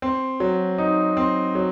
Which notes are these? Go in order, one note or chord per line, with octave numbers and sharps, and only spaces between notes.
C4
F#3
D#4
C4
F#3